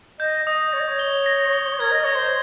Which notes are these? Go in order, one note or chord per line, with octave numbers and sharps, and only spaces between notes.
D#5 G6
D#5 D#6
C#5 A#6
D#5
C#5
G7
A#6
G7
A#4 G#6
D#5
C#5 G7
C5